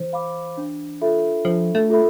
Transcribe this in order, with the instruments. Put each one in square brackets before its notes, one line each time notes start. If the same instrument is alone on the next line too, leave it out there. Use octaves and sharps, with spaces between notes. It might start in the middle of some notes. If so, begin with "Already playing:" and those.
Already playing: [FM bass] E3 [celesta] C5
[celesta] F5 B5 D6
D4
F4 A4 E5 B5
[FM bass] F3 [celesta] D4
[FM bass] A3
[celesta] F4 A4 E5 B5